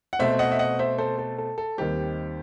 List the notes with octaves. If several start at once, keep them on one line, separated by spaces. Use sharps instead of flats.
F#5
B2 A3 C4 C5 E5
D#5 F#5
E5
D#5 F#5
C5 E5
A4 C5
A4
A4
A4
D#2 D#3 G3 C4 G4